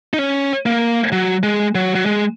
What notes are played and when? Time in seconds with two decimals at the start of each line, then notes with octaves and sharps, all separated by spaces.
0.14 D#4
0.19 C#4
0.66 A#3
1.12 F#3
1.43 G#3
1.75 F#3
1.95 F#3
2.06 G#3